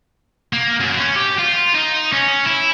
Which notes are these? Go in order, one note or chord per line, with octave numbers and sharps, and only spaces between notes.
A#3
F#2
C#4
G4
F4
D#4
C#4
E4